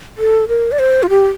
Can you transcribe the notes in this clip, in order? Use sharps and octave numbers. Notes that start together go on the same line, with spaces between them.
A4
A#4
D5
C5
F4
G4